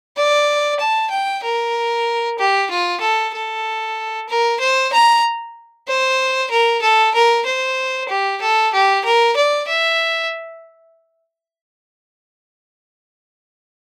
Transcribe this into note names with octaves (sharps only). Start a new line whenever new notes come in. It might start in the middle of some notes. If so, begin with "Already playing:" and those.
D5
A5
G5
A#4
G4
F4
A4
A4
A#4
C5
A#5
C5
A#4
A4
A#4
C5
G4
A4
G4
A#4
D5
E5